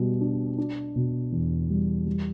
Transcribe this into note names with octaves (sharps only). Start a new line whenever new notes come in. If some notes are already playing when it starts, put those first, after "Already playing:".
Already playing: B2 G3
D4
D4
B2
E2
G3
G3